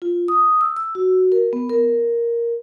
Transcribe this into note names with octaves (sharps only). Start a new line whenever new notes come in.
F4
D#6
E6
E6
F#4
A#4
B3
A#4